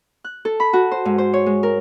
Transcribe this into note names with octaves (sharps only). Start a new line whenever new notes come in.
F#6
A4
B5
F#4
C5
G#2
C5
C#5
G#3
A#4